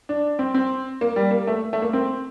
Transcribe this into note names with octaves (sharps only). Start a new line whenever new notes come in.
D4
C4
C4
A#3
G3
A#3
A3
A3
A#3
C4